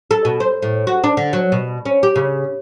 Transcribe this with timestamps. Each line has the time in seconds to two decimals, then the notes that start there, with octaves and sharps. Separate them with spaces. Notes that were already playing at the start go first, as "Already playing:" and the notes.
0.11 A4
0.25 B2
0.40 C5
0.62 A2
0.87 F#4
1.04 D4
1.17 D3
1.33 F#3
1.52 B2
1.85 C#4
2.03 G4
2.16 C#3